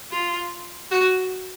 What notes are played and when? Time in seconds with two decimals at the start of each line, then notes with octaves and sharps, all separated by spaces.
0.12 F4
0.91 F#4